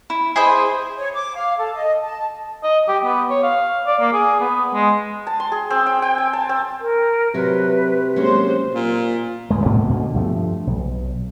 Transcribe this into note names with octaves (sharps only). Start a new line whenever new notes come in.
E4
E4 G#4 C5 D#5 B5
C#5
D6
F5
A4
D#5
A5
D#5
G4
B3
C#5
F5
D5
A#3
G#4
B3
G#3
A5
C6
G#4
C4
G5
G5
G#5
A5
C4
A#4
C3 F#3 B4
F#3 G#3 A#3 C#4 C5
A#2
D1 E2 G#3
G#2 B2 A3 A#3
D2 B2 D3
G2 F3 A3
B1